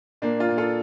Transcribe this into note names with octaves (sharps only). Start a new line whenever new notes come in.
A#2 A#3 D4
D4 F4
A#2
F4 A4